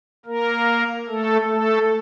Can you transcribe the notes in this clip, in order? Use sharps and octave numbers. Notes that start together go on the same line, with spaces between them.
A#3 A#4
A3 A4
A3 A4